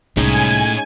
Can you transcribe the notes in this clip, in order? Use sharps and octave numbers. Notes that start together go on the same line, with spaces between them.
C2 A2 G#3 C#4 D#4 G#5